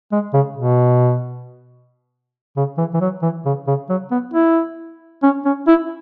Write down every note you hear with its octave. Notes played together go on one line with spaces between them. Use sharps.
G#3
C#3
B2
C#3
E3
E3
F#3
E3
C#3
C#3
F#3
B3
E4
C#4
C#4
E4